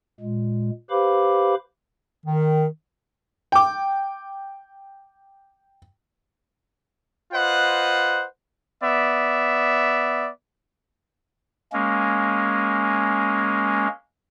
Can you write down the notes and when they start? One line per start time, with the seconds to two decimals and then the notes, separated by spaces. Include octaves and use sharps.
0.20 A#2 G#3
0.90 G4 B4 C5 F5 B5 D6
2.24 D#3
3.52 G5 D6
7.33 F4 B4 C5 D#5 F#5
8.82 B3 D5 E5
11.73 G#3 A#3 C#4